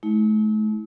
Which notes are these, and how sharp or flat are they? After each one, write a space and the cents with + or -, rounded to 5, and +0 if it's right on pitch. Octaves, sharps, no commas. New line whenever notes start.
A3 -40 E4 -40